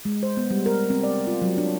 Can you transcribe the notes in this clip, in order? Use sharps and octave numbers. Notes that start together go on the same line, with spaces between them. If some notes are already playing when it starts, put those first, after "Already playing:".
G#3
C5
B3
G3
A#4
C4
D5
F4
F#3
D4